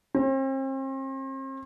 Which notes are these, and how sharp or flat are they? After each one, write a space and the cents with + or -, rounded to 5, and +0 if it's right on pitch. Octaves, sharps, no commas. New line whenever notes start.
C4 +40